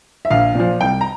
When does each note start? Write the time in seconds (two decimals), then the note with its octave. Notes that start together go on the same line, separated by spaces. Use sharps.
0.25 E5
0.30 A#1 F5
0.55 A#2 F3
0.81 C2 G5
1.01 A#5